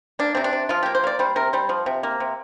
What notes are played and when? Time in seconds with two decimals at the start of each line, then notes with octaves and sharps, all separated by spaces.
0.19 A#3 D4
0.35 C3 C4
0.44 D4
0.53 C3
0.69 F3 F4
0.83 A#3 G4
0.95 C5
1.04 A#3 D5
1.19 G3 C5
1.36 C3 A#4
1.53 G3 C5
1.69 F3
1.86 C3
2.03 A#3
2.20 C3